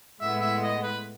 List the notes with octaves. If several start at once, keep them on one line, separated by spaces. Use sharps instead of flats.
A2 G#3 B3 E4 E5
E5
D#5
B4